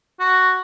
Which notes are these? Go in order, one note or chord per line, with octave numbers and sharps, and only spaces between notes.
F#4